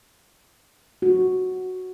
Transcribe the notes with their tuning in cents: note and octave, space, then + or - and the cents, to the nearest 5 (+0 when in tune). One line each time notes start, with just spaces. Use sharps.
F#4 +0